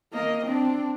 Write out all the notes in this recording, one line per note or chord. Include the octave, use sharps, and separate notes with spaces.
A#3 D#5
C4 D4